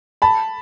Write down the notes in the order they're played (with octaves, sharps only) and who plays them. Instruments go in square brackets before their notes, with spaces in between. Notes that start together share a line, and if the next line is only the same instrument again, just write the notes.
[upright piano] A5 B5